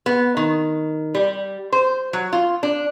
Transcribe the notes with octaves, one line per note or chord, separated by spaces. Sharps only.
B3
D#3
G3
C5
F#3
F4
D4